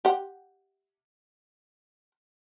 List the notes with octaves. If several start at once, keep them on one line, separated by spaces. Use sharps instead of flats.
G4 F#5